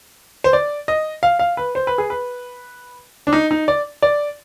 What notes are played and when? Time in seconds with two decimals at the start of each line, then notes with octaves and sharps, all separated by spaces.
0.44 C5
0.53 D5
0.88 D#5
1.23 F5
1.39 F5
1.57 B4
1.75 C5
1.87 B4
1.98 G#4
2.10 B4
3.27 D4
3.33 D#4
3.51 D#4
3.68 D5
4.02 D5